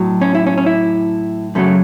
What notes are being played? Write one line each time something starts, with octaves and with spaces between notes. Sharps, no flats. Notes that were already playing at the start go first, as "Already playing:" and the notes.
Already playing: A2 F#3
C#4
E4
C#4
C#4
E4
F#2 C#3 F#3 A3